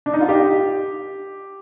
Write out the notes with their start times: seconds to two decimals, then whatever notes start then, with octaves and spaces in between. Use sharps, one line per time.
0.06 D4
0.13 D#4
0.21 F4
0.29 G4